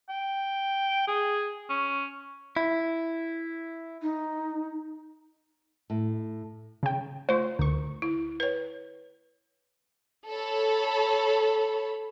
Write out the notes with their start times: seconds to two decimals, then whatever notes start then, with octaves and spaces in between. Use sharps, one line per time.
0.10 G5
1.08 G#4
1.70 C#4
2.57 E4
4.02 D#4
5.90 A2
6.83 C#3 G5
7.29 A3 F4 C5
7.59 D2 D3 C#6
8.02 E4
8.40 B4 C#5
10.28 A4 C#5 B5